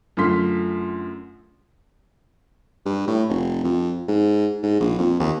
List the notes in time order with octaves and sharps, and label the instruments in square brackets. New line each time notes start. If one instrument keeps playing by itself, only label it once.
[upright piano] F#2 D3 A3 F4 C6 B6
[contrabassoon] G2
A2
F1
F2
G#2
G#2
A#1
F2
D#2